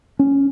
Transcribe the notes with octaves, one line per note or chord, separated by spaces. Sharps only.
C#4